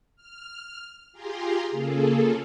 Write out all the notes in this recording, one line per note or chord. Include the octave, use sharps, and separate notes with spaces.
F6
F4 G4 G#4 G#5 A#5 C6
C#3 A#3 F4 G#4 A4